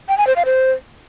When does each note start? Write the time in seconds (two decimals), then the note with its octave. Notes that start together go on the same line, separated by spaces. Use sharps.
0.09 G5
0.18 G#5
0.27 C5
0.36 F5
0.45 C5